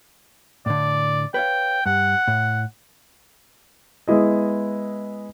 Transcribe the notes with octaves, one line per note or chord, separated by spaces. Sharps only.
A2 D3 D5
B4 C#5 F5 G5
G2 F#5
A2
G#3 B3 E4 D#5